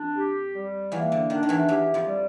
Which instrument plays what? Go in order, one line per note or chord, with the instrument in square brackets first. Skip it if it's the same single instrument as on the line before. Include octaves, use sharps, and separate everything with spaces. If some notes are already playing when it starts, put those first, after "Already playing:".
Already playing: [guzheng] F2 [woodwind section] D4
[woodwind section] G4
G3
[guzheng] E2 E3 [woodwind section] A#3
[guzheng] D3
[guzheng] D#3 [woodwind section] D4
[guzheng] D#3
E2 E3
[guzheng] E2 E3 [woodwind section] G4
[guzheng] F2 F3
[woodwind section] G3